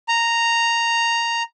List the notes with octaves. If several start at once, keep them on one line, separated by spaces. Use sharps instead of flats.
A#5